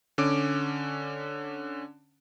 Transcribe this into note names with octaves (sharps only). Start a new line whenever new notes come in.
D3 C#4 D6 D7